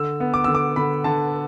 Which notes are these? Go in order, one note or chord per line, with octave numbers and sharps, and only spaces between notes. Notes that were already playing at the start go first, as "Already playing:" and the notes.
Already playing: D3 E6
B3
D6
D3 E6
D6
D3 B5
D3 A5